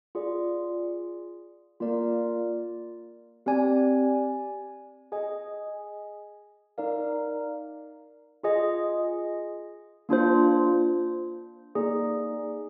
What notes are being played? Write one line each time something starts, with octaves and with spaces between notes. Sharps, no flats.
F4 G#4 D5
A#3 F4 A#4 D5
C4 G4 D5 G#5
G#4 D#5 G#5
D#4 A#4 D5 F5
F4 G#4 D#5 G#5
A#3 D4 F4 C5
A#3 D#4 G#4 D5